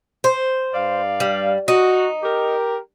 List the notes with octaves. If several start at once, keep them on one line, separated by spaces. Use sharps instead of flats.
C5
G2 D5 F5
G3
D#4 F#4
G4 A#4